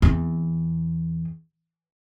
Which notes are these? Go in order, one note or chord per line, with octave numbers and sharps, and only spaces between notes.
E2 C4